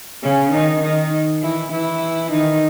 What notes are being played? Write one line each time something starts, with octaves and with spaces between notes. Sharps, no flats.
C#3 C#4
D#3 D#4
D#3 D#4
E3 E4
E3 E4
D#3 D#4